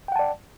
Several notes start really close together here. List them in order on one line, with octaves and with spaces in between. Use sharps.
G5 F#5 A5 D5